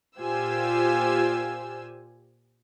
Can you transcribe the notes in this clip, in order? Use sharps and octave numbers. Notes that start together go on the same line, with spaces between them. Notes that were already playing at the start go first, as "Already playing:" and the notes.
A#2 F4 G4 C5 G#5 E6